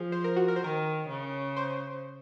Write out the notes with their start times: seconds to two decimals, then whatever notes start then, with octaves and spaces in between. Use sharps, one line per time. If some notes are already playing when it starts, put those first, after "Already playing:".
Already playing: F3 G#4
0.12 C5
0.24 A#4
0.36 F#4
0.48 A#4
0.56 C5
0.61 D#3 A#4
1.08 C#3
1.57 C5